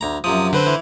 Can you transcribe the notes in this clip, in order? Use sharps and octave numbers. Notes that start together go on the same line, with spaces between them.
D2 A#5
F#2 C3 F3 D#6
D3 C4 B4 C5
E3